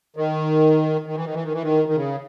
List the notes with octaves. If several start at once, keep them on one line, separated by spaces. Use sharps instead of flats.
D#3
D#3
E3
D#3
E3
D#3
E3
D#3
D#3
C#3